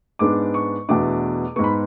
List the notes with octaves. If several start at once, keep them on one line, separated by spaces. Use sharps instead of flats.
G#2 G#3 B3 D4 D6
C#6
E2 B2 A3 D4 D6
G#2 G#3 B3 C#6
B5